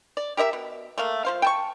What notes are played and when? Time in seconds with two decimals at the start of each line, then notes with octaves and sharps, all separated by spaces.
0.17 D5
0.37 G4 A#4 D#5 E5
0.53 B2
0.98 A3 A#3 F5
1.25 F3 C5 F5
1.42 G5 A5 C#6